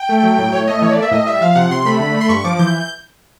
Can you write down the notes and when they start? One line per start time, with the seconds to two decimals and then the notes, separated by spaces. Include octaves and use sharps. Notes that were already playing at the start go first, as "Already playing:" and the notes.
Already playing: G5
0.09 A3
0.23 F#3
0.38 A2
0.52 A2 C#5
0.67 A3 D#5
0.82 E3 C#5
0.92 A#3 D5
1.02 E5
1.11 A2 D#5
1.27 G3 E5
1.41 F3 F5
1.55 C3 F#5
1.70 C3 C6
1.85 A3 B5
1.99 D3
2.14 A3
2.21 C6
2.29 G2 C#6
2.44 F3 D6
2.59 E3 G6